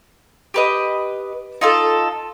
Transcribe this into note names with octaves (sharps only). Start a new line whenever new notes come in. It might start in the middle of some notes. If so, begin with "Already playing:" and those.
G4 B4 D#5
D#4 F4 A4